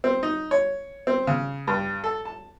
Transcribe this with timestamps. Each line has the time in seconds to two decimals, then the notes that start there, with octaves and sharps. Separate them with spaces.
0.04 C4
0.23 D#4
0.51 C#5
1.07 C4
1.27 C#3
1.67 G2
2.04 A4
2.25 A5